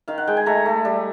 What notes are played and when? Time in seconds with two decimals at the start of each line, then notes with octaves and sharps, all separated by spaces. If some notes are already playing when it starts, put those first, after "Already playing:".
0.08 D#3 F5
0.18 F#5
0.27 G#3 G5
0.37 G#5
0.46 A3 A#5
0.66 A3
0.85 G3